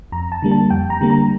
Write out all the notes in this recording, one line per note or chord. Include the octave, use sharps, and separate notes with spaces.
F2 A#5
A5
D3 G3 A#3
A5
F2 G5
A#5
D3 G3 A#3
A#5